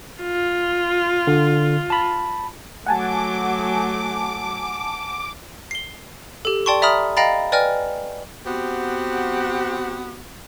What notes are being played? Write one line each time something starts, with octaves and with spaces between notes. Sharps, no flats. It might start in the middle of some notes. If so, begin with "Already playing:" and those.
F4
D3
A5 B5
F#3 A3 F#5 G#5 A5 D6
C7 G7
G4 A4
D5 G5 A5 C6 C#6
D5 E5 A#5 B5 D#6 F6
D#5 F5 G5 A#5 B5 A6
B4 D5 D#5 G5 G#5 F6
B3 C4 F#4 G4